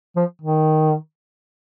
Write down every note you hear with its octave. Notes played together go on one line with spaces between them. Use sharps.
F3
D#3